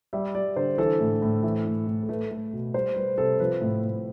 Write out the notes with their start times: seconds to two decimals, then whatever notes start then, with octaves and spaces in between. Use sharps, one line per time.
0.13 G3 E5
0.35 G3 D5
0.56 D3 C5
0.78 E3 A4
1.00 A2
1.22 A2
1.43 E3
1.66 A2
1.87 A2
2.03 A4
2.09 A3 B4
2.31 A3
2.53 B2
2.74 G3 C5
2.96 G3 B4
3.18 C3 A4
3.40 F3 B4
3.61 A2
3.83 A2